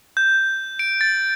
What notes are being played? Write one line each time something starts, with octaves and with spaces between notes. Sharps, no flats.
G6
D7
A6